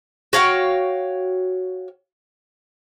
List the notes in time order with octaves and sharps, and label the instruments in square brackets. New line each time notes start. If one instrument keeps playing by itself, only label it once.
[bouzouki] F#4 C#5 F5 G5